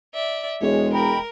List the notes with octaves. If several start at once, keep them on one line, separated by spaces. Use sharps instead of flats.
D5 E5
E1 G#3 C#5
A#4 G5 A#5 B5